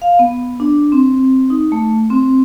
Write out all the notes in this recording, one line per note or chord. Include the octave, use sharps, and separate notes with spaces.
F5
B3
D4
C4
D#4
A3
C4